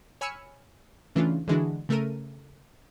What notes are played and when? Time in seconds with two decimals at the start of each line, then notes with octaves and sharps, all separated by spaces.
0.21 C#5 G#5 B5 E6 F6 C#7
1.15 C#3 E3 A3 C#4 D4 F4
1.48 D3 E3 G#3 D4 E4 F#4
1.89 C#3 A3 A4 A#4 D#7